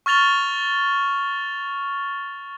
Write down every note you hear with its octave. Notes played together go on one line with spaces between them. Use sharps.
C#6 F6 A6 F7 G7